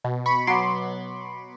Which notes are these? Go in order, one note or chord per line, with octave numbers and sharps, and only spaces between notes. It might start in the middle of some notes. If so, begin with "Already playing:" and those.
B2
B5 C#6
F#3 B3 C6 D6